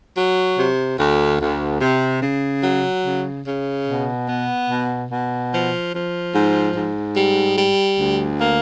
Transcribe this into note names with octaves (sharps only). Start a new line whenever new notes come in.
F#3
C3
D2
D2
C3
C#3
F#3
C#3
C#3
B2
B3
B2
B2
F3
F3
G#2
G#2
G3
G3
D2
A#3